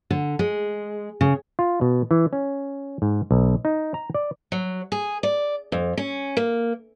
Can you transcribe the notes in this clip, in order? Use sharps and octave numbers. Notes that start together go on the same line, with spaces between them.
D3
G#3
C#3
F4
B2
E3
C#4
G#2
B1
D#4
A#5
D5
F#3
G#4
D5
F2
C#4
A#3